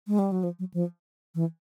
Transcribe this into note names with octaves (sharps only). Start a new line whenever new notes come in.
G#3
G3
F#3
F3
F#3
F3
E3